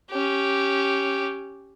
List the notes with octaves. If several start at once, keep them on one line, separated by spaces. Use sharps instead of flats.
C#4 G4